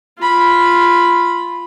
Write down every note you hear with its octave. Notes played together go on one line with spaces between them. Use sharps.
F4 B5